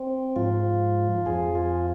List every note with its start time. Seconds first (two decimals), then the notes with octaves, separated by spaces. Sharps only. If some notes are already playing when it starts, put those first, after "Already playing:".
Already playing: C4
0.36 G#2 F3 F4
1.25 F2 F3 G#4
1.55 F4